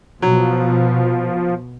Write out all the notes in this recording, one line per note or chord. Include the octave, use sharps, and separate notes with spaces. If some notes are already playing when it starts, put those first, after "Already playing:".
B2 F3 F#3